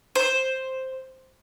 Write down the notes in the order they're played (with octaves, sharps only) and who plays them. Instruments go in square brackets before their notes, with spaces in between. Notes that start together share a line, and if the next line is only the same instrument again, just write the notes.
[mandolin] C5